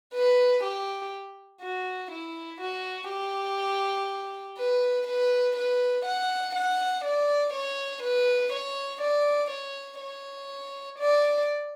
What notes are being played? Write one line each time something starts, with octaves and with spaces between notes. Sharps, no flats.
B4
G4
F#4
E4
F#4
G4
B4
B4
B4
F#5
F#5
D5
C#5
B4
C#5
D5
C#5
C#5
D5